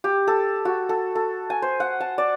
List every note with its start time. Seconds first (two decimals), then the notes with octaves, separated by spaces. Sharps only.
0.04 G4
0.27 A4
0.65 F#4
0.89 A4
1.15 A4
1.50 G#5
1.62 C5
1.80 F#5
2.01 A5
2.18 D5